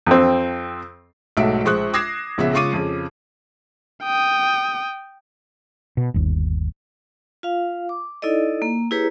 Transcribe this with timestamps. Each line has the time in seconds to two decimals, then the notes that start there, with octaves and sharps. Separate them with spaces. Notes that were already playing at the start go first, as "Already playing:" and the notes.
0.06 F2 C4
1.37 B1 G#2 F#3 A3 E5 D7
1.65 A#1 G#3 C5 C#6 D#6 F#6
1.93 D6 D#6 G#6 A#6 C7 E7
2.38 A#1 C#3 B3 E5
2.53 C#3 G#3 F4 C#6 D6 D#7
2.73 F2 C#3
4.03 G5 D#6
5.97 B2
6.14 G1 D#2
7.43 F4 F5
7.89 D6
8.22 D#4 E4 A4 D5 D#5
8.62 A#3
8.91 E4 G4 G#4 B4 C#5 A#5